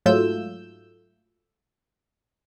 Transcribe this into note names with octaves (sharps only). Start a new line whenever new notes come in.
G#2 F#3 A3 F4 E6 G6